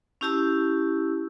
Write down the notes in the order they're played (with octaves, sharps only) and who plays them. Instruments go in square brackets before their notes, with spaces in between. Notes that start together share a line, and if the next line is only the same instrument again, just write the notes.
[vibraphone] C#4 E4 G4 A5 E6